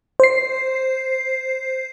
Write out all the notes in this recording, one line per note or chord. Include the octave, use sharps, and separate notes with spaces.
C5 C7